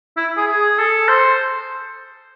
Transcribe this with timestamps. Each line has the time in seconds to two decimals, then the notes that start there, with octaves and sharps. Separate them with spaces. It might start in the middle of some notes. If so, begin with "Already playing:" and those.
0.17 E4
0.37 G#4
0.47 G#4
0.78 A4
1.08 C5